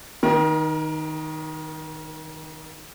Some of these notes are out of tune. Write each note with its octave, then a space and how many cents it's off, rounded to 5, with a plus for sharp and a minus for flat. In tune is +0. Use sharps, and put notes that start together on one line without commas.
D#3 +0 A#4 +40